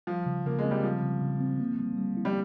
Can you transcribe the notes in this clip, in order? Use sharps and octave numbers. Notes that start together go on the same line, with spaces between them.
F3 G3
C#3
C#3 A#3
G#3
C4
G3
F3 G3
C#3
C#3
C4
A#3
G3
G3
E4
G3